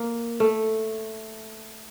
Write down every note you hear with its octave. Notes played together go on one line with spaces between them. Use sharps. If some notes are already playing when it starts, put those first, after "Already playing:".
Already playing: A#3
A3